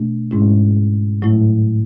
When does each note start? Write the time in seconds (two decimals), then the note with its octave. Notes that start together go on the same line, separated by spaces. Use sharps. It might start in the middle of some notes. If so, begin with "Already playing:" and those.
Already playing: B2 A3 D4
0.31 G#2 G#3 C#4 E4
1.22 A2 F#3 A3 E4